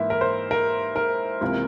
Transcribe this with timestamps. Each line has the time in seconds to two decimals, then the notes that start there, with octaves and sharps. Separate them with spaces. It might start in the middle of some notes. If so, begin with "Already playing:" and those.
Already playing: G#2 E3 A#3 E4
0.10 A#4
0.21 C5
0.51 A#4
0.96 A#4
1.41 C#2 C3 E3 A#3